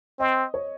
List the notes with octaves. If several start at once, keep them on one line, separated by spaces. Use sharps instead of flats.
C4 D#5
C#5